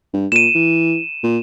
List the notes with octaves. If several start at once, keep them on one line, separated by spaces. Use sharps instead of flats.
G2
A#2 D#7 E7
E3
A#2